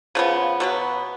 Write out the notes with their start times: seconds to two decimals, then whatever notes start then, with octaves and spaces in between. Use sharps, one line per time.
0.15 C#3 F3 B3
0.60 B2 F#3 B3